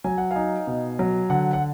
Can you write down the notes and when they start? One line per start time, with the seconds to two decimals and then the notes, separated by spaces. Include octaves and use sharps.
0.04 F#3 G#5
0.18 F#5
0.31 D#4 F5 G#5
0.67 B2
0.99 F#3
1.30 D3 F#5
1.53 F#5